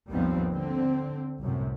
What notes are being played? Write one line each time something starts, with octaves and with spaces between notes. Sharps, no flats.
G#1 D#2 F3 G3 B3 C4
D3 C4
C2 F#2 A2 C3